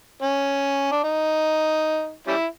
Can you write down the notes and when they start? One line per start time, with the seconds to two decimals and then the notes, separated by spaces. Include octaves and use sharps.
0.22 C#4
0.92 D4
1.04 D#4
2.27 G3 C#4 E4